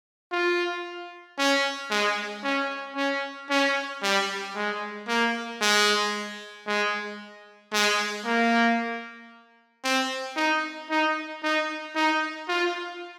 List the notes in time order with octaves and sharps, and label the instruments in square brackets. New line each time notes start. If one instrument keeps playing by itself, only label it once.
[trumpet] F4
C#4
G#3
C#4
C#4
C#4
G3
G#3
A#3
G#3
G#3
G#3
A#3
C4
D#4
D#4
D#4
D#4
F4